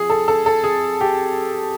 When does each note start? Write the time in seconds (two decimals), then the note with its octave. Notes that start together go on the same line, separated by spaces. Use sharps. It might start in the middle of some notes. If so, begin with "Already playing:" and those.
Already playing: C3 F3 G#4
0.10 A4
0.28 A4
0.46 A4
0.64 G#4
1.01 G4